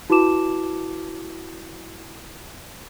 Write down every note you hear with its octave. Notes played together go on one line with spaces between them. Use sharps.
E4 F#4 B4 A5 D6 E7